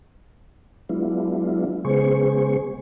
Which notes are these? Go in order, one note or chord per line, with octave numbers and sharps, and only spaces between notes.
F#3 G#3 B3 D4 E4 F4
C#3 G#3 B3 G#4 C5 C#6